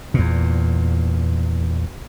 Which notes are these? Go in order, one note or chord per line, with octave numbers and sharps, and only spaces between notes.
E2 A#2